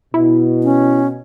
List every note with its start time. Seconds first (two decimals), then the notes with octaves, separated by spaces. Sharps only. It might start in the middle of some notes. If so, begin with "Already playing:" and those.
0.14 B2 E4
0.63 C#4